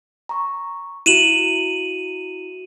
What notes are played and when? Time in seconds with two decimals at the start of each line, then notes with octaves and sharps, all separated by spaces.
0.29 A#5 C#6
1.06 E4 F#4 D#7 E7 F#7